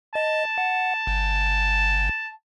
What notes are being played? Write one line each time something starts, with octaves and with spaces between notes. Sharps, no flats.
D#5 A5
F#5
G1